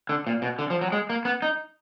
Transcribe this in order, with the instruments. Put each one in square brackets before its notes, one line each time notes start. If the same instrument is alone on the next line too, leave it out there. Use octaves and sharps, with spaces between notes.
[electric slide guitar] D3
A#2
B2
D3
F3
F#3
G#3
A#3
B3
D#4